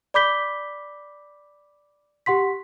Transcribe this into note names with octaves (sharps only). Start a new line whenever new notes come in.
D5 B5 D6 G6 B6 G7
G4 F#5 C6 B6